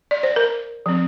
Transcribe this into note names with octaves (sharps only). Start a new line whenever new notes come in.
D5
C5
A#4
F3 C4